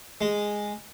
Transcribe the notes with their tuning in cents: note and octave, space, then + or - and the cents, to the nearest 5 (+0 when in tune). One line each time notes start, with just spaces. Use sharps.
G#3 -5